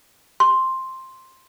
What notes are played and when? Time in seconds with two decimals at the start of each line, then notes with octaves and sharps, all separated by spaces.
0.40 C6